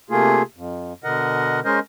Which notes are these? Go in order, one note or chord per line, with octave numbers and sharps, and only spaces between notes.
C3 A3 A#3 F4 G#4
F2
B2 D3 A#4 D#5 F#5
G#3 C#4 A#4 C5 D#5